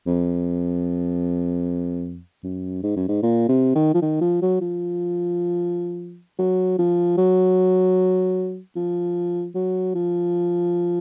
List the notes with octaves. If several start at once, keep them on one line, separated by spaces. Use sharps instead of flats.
F2
F#2
G#2
F#2
G#2
A#2
C3
D#3
F3
D#3
F3
F#3
F3
F#3
F3
F#3
F3
F#3
F3